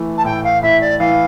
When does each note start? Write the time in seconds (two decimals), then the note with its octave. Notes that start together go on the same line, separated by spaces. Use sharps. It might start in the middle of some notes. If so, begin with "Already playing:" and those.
Already playing: E3 A3
0.17 A5
0.25 A2 G5
0.44 F5
0.63 A2 E5
0.81 D5
0.99 E3 F5